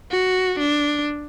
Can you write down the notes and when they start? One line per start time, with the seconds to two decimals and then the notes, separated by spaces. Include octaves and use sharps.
0.11 F#4
0.59 D4